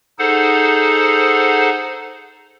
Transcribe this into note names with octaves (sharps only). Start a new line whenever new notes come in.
D#4 G#4 A4 C5 F#5